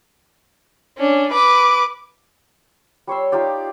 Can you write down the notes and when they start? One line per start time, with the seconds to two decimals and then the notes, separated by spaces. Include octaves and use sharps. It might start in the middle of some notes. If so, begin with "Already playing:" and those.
0.98 C#4 D4
1.32 B4 D6
3.07 G3 C#5 C6 E6
3.32 D#4 F4 G4 D5